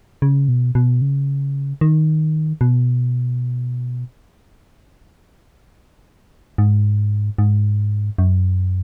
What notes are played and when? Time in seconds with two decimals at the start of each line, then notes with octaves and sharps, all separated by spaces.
0.22 C#3
0.49 B2
0.75 B2
1.02 C#3
1.81 D#3
2.61 B2
6.58 G#2
7.38 G#2
8.18 F#2